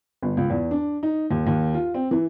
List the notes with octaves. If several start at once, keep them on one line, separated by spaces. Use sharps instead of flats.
G1
C#2
E2
D4
D#4
D#2
D#2
F4
C4
E3